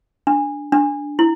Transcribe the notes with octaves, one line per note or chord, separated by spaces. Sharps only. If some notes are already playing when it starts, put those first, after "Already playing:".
D4
D4
E4